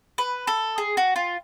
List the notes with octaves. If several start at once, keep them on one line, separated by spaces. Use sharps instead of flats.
B4
A4
G#4
F#4
F4